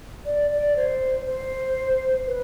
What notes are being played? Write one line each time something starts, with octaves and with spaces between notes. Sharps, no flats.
D5
D5
C5
C5
B4